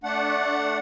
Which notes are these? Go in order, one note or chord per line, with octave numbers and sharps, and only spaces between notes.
A3 D4 F#5